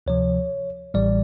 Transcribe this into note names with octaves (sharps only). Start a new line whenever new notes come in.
D2 C3 F3 C#5
A1 A2 E3 G3 D5